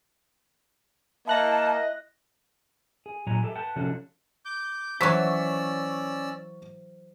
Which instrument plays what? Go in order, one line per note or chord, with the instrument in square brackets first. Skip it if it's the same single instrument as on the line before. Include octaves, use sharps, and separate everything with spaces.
[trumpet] A#3 [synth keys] E4 F#6 A#6 [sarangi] D#5 [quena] A5
[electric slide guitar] G#4
A#2 F#3 G#4 G#5 A#5
G4 A4 D5 E5
B4 F#5 G5 A5
C3 F3 C#4 D4 F#4 A4
[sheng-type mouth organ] D6 G6
[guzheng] E3 F#3 [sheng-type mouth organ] C#4 D5 E6 [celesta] C5 [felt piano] C#6 B6